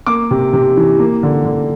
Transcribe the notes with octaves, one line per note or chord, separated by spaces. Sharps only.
A#3 D6
C3
C3
E3
A#3
D3
D3